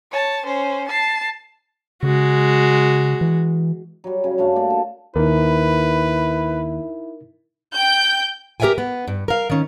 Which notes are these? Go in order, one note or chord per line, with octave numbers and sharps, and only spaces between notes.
C#5 A5
C#4 C5
A5 C7
C#3 G#3 F#4
E3
F#3 G3
C#3
G2 A3 F#4 F5
A#3 G4 D5 F#5
A4
D#2 D#4 E4 A#4 B4
G5 G6
G4 A#4 D5 E5 G5 G#5
B3
G2
A#4 F5
D#3 C#4